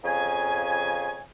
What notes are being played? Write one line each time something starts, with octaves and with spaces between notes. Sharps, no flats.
F2 C#3 G#5